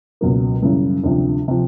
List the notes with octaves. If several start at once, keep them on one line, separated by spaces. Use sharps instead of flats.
C#2 B2 F#3 A#3
F#2 C#3 E3 G3
D2 C3 F3
C3 F3